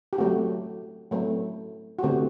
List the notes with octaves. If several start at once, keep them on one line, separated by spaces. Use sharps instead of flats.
G4
F#3 A3 C4 F#4
F#3 A3 C4
F#4
D3 A3 C4 G4